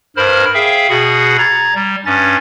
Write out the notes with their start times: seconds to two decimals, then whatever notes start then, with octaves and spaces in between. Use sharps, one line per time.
0.17 G2 A#4 C5 B5 F6
0.54 G#4 E5 F5 G5
0.89 B2 F#4 G#4 F#5 B5
1.38 A#5 G#6 A6
1.75 G3
2.06 G2 C#4 A6